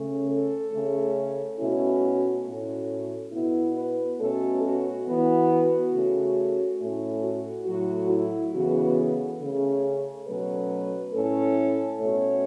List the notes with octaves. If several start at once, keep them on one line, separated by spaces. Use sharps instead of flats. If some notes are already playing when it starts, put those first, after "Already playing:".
Already playing: C#3 A3 C#4
A4
C#3 A3 C#4
B2 A3 C#4 E4
F#4
A2 A3 C#4
B2 B3 E4
B4
B2 A3 C#4 A4
F#4
E3 B3
F#4
C#3 A3 C#4
A2 A3 C#4
F#4
A2 F#3 A3 F#4
E4
C#3 E3 B3 F#4
A4
C#3 A3 C#4
B2 F#3 A3 C#4 B4
A2 A3 C#4 A4
B2 A3 C#4 C#5